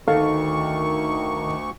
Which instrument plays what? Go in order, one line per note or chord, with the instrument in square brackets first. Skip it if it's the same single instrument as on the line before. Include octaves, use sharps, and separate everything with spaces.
[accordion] D2 C#6 [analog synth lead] D#3 [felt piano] A4 F5